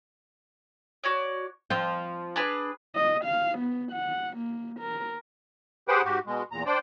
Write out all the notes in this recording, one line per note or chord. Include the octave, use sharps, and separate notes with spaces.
F#4 C#5 D5
F3 C4 F4 G5
D4 G#4 B4
D#5
F5
B3
F#5
A#3
A#4
G4 G#4 B4 C5 F#5 G5
G#2 F#4 G4
B2 G#3
E2 A#2 A#5
D4 C5 D5 G5